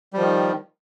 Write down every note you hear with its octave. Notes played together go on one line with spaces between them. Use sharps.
D#3 F3 G3